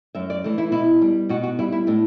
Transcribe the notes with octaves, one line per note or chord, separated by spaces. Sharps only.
F#2 E5
D5
E3 A3
E4
B2 E4
G3
B2 F#4
F#4
G3 E4
E4
A2 D4